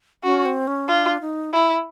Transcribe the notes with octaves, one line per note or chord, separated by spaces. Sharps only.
C#4 F#4
C4
C#4
D4 F4
D#4
E4